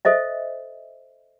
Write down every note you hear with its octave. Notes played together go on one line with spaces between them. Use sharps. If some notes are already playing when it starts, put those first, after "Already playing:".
A4 C5 D#5 E5